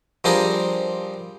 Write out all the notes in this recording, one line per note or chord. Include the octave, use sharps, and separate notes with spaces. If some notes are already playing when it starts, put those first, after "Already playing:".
F3 G3 C4 D4 G#4 A#4